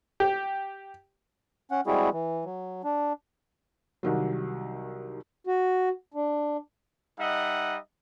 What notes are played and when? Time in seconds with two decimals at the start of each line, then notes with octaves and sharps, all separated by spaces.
0.20 G4
1.71 C#4 F#5
1.87 G3 G#3 C4 E4 F#4 G#4
2.13 E3
2.45 F#3
2.84 D4
4.03 C2 D#3 F#3
5.47 F#4
6.14 D4
7.18 G3 D#4 D#5 E5 F#5